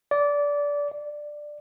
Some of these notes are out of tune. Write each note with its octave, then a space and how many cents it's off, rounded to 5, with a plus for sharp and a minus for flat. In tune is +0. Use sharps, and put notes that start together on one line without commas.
D5 -20
D5 +10